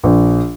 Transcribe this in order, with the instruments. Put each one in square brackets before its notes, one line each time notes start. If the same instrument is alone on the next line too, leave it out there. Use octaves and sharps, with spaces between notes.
[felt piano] A#1